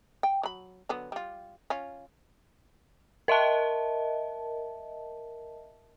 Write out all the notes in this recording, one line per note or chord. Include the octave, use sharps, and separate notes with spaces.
G5
F#3 B5
D3 F#3 B3
G3 F4
C#4 F4
A#4 D#5 E5 A5